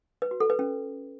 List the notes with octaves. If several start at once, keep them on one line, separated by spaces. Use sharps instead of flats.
B4
F#4
A4
B4
C#4